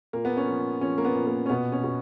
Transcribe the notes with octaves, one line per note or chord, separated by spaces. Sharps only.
A#2 A#3
B3
C#4
F3
F3 C#4
A#3
B3
A#2
A#3
C#4
B2 B3
C#4
B2